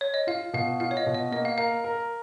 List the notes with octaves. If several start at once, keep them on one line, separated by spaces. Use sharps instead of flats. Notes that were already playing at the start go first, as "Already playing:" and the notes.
C#5
D#5
F4 F5
B2 F5
F4 F5
C#5
D#5
B2
D#5
A#3 D#5
F5
A#4 F5
A#4